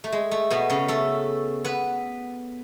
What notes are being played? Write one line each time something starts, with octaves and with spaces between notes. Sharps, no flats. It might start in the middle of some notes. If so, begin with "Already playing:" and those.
A3
G#3
A3
B2 B3
C#3 C#4
A3 A4
B3 B4